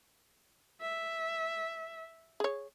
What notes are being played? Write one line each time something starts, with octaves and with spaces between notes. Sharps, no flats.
E5
G#4 C#5